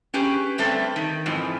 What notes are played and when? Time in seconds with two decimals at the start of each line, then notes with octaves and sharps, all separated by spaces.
0.14 C#4 G4 G#4 B4
0.58 D3 G3 A3 C4 A4 B4
0.96 D#3
1.26 F2 G#2 E3 F3